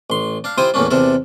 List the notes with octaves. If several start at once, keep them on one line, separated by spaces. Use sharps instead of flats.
A1 C6
D4 F5
E4 F4 G4 C5 G#5 D#6
E2 A2 A#3 C#4 D4
E2 C3 D4 A4 A#4